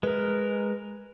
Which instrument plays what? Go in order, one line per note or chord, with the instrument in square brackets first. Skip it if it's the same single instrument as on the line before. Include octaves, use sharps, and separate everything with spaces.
[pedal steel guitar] G#3 A#4 [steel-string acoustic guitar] B4